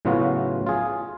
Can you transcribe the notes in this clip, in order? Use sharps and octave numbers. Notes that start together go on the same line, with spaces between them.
A2 C#3 F#3 B3 F4 F#4
F4 G#4